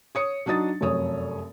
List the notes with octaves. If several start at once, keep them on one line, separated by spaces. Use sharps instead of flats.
C#5 D#6 C#7
F#3 D4 D#4 D#6 A6
F1 F#2 C#5 D#6